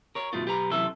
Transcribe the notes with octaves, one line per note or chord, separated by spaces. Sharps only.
A#4 C#5
G2 B2 D#3 A3 F4
B1 G4 B4 A#5
F#2 C3 E3 A4 E5